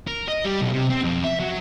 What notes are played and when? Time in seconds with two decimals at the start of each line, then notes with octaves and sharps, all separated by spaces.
0.07 A#4
0.28 D#5
0.45 G3
0.61 B1
0.74 C3
0.90 C4
1.04 F2
1.24 E5
1.40 F#3